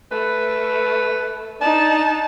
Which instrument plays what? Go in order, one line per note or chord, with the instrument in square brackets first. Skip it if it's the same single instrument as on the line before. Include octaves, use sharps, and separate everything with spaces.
[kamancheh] A3 [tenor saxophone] B4
[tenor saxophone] D4 [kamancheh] D#4 A5